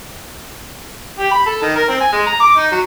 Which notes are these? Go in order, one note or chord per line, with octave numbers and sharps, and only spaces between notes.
G4
B5
A4
D#3
A#4
C4
G#5
G#3
A#5
D6
D#4
F#3